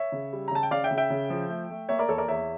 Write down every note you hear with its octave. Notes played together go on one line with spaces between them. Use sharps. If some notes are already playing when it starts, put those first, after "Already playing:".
Already playing: C#5 E5
C#3
G3
A#5
C#3 A5
G5
C#3 D5 F5
E5 G5
C#3
E5 G5
C#3
F3
A3
A3
A#3 C#5 E5
A#4 D5
E2 A4 C#5
A#4 D5
E2 C#5 E5